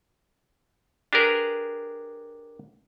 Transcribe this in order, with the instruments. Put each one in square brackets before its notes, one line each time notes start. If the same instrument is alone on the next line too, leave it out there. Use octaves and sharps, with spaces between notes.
[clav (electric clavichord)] D4 G4 G#4 A#4 B4